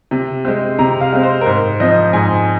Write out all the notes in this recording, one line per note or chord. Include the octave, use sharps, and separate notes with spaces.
C3
G#3 C4
C3 A#5
F5
G#3 C4
C5
A#4
G#2 C5
F3 C4 D#5
G#2 G#5